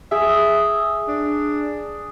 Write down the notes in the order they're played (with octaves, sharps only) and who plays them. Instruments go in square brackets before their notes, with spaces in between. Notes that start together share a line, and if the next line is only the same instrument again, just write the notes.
[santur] G#4 [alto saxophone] E5
[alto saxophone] D4